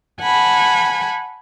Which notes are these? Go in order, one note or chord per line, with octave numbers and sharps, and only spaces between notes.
F#5 G#5 A5 B5